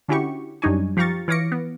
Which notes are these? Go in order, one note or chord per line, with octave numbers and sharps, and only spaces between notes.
D3 C#4 E4 F#4 G4 C#6
F#2 G3 D4 D#4 C#5 G#5
F3 G4 F5 A#5 C#6 A6
E3 C#5 F5 D6 A#6 C#7
B3